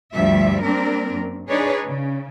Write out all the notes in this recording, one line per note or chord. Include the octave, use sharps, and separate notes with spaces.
D2 G2 F3 G3 E5
G3 A#3 C4 D4 A#4
F#2
D4 D#4 G#4 B4 C#5
C#3